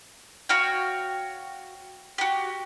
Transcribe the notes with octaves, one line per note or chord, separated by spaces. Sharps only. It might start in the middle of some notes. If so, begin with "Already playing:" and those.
F#4 C#5 F5 G5
F#4 G4